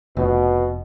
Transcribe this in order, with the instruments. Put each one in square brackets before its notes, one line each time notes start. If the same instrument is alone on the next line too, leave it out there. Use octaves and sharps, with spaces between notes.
[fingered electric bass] F1 [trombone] B2